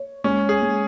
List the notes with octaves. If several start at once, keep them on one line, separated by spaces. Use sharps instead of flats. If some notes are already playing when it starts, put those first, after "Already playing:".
Already playing: C#5
G#3 C#4
G#4
G#3